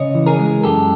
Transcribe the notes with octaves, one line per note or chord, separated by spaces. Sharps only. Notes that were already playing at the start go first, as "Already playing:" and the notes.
Already playing: C#3 C#5 D#5
E3
G#4 A#4
G#3
F#2 G4 A4